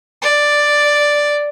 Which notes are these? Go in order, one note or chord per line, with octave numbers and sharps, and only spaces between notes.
D5